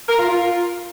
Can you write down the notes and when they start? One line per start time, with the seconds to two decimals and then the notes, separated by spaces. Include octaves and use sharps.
0.08 A#4
0.18 F4
0.28 F4